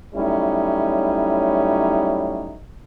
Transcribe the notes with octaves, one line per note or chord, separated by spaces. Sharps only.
F#3 G3 A3 C#4 D#4 E4